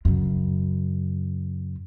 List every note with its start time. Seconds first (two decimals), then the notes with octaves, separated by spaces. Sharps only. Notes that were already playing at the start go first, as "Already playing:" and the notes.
0.05 F#2 C#3